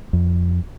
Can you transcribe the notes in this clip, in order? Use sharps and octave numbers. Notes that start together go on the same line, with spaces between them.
F2